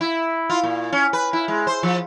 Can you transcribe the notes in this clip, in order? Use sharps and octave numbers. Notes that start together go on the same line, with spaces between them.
E4
F4
A#2
C#4
B4
E4
G#3
C5
F3